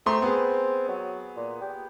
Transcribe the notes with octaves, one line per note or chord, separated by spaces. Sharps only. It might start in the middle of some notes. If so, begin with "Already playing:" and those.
A3 C4 A#5 C6
B3 G#4
F#3
A#2
G4